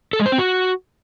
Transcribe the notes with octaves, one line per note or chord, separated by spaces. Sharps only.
A4
G#3
C5
C4
F#4